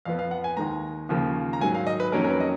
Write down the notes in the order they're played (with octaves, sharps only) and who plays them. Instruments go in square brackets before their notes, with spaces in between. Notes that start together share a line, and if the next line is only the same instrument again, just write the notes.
[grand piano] F2 F3 B3 F5
F5
F#5
G#5
D#2 D#3 G#3 A#5
D#2 C#3 F3 A#3
A#5
G#2 D#3 F#3 G#5
F5
D#5
B4
F2 D#3 F#3 A#3 C#4 A#4
A#4
B4
D#5